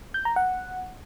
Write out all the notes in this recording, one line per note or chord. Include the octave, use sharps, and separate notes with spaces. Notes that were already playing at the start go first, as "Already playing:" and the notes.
G6
A#5
F#5